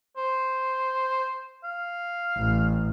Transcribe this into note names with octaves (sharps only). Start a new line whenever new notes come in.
C5
F5
A1